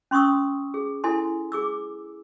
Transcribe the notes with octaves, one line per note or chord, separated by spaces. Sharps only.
C#4 C6 C#6 D#6 E6
G#4
E4 A4 G#5 C6
G#4 D6 E6